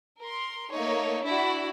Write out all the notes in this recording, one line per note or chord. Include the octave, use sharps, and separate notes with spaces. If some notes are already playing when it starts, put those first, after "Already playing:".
A#4 C6
A3 A#3 D#4 C#5
D4 E4 F#4 D5 B5